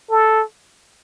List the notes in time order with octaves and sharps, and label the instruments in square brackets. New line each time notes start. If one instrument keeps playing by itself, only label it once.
[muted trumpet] A4